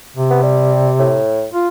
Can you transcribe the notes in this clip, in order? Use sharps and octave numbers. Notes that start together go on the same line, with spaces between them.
C3
B3
G3
A2
F4